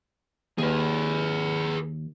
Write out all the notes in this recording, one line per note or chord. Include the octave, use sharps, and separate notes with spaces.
D#2 G#4 B4